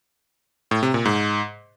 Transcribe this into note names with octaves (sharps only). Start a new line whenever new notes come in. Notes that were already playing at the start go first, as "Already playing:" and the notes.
A2
C3
A#2
G#2